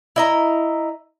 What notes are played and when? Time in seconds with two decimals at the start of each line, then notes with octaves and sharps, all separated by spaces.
0.16 E4 D#5 A#5